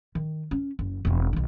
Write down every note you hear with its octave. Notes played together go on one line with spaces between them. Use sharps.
D#3
C#4
F#1
E1 C4
B1 D#3